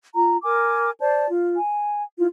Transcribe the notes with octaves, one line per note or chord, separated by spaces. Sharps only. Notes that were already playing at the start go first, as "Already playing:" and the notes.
F4 A#5
A#4 G#5 D6
C5 D5 A5
F4
G#5
E4 F4